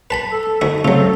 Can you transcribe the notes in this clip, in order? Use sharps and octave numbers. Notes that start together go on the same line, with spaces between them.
B4 A5 B5
A4
D2 D#4 F#4
C#3 F#3 A3 C4 F4 A4